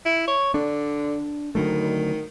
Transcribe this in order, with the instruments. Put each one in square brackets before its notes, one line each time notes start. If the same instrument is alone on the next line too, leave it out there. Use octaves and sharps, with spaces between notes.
[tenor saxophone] E4
C#5
[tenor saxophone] D3 [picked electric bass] D4
[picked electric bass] D3 F#3 A3 [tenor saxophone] D#3